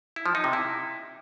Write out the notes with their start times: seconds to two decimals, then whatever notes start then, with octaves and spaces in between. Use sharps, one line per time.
0.16 E4
0.26 F3
0.35 D#4
0.44 C3
0.53 E4